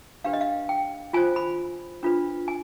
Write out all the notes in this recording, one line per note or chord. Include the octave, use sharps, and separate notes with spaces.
D4 G4 B4 F5
D#5
F5
G5
F4 C5 G#5
B5
D4 F4 B4
G#5